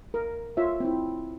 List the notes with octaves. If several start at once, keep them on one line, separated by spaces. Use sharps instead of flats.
A#4
F4 C#5 E5
C4 E4